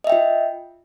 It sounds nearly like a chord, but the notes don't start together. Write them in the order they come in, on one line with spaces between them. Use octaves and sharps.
D#5 E5 G5 F4